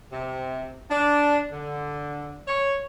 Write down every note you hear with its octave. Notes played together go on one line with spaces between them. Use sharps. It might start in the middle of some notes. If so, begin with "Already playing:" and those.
C3
D4
D3
C#5